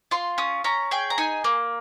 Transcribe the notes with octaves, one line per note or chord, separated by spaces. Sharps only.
F4 C6
C#4 D#6
C#4 A#5
G#4 G5
A#5
D#4 G#5
A#3